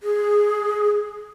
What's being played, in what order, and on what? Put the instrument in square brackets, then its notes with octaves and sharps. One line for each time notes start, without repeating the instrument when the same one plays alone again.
[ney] G#4